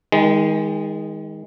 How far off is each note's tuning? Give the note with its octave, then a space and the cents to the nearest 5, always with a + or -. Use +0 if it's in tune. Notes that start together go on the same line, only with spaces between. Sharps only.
D#3 +25 G#3 -15